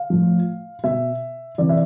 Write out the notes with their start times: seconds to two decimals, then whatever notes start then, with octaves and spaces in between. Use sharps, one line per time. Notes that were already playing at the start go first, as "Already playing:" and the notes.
Already playing: F5
0.10 A2 F3
0.84 B2 E5
1.58 C3 E3 D5
1.69 E5